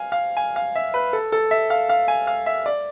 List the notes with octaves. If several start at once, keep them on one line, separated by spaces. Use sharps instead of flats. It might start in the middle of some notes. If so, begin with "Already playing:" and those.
Already playing: F5 G#5
F5
G#5
F5
E5
B4
A4
A4
E5
F5
F5
G#5
F5
E5
D5